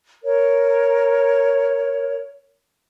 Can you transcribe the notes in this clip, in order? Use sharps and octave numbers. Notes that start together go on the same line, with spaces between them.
A#4 C#5